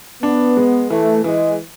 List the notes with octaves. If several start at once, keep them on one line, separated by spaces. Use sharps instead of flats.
B3 D4
G#3
E3 A3
E3 G#3